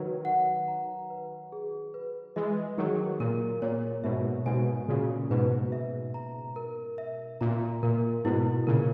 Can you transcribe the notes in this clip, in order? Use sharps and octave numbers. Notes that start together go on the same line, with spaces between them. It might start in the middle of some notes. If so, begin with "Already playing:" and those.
Already playing: D#3 F#3 B4
F#5
A#5
B4
G#4
B4
E3 G#3 D#5
D#3 F#3 G#4
A#2 A#4
A#2 C#5
G#2 B2 E5
G#2 B2 G#5
A#2 C#3 F#4
G#2 B2 B4
E5
A#5
A#4
E5
A#2 A#5
A#2 A#4
G#2 B2 E4
A#2 C#3 A#4